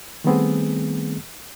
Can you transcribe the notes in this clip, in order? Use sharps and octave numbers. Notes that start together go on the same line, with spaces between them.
D#3 G3 A3 B3 C4 G#4